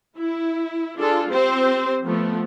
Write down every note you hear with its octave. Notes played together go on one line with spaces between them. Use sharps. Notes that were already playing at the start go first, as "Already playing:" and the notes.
E4
D4 F4 G#4 A4
C4 G4 C5
F3 A3 B3